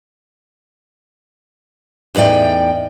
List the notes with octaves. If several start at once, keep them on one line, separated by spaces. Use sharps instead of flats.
E2 A2 D#4 D5 G5